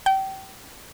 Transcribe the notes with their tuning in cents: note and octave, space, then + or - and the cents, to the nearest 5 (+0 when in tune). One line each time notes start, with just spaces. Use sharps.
G5 -25